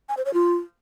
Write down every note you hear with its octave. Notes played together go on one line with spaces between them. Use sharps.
G#5
C5
C#5
F4